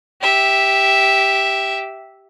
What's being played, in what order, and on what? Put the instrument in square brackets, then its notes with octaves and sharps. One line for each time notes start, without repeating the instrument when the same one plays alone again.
[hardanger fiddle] G4 E5